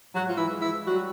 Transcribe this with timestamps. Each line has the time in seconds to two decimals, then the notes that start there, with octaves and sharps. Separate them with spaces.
0.14 G#2 F#3 F#4
0.29 F4
0.38 E3 E4
0.50 G#3
0.62 E3 E4
0.86 F#3 G3 F#4